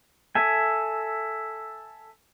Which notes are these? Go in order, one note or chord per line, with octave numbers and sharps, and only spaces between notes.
A4 E5 G#5